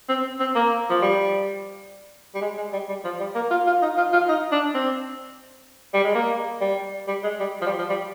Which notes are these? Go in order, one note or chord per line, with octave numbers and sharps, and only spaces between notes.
C4
C4
A#3
F3
G3
G3
G#3
G#3
G3
G3
F3
G3
A#3
F4
F4
D#4
F4
F4
D#4
D4
C4
G3
G#3
A#3
G3
G3
G#3
G3
F3
G3
F3
G3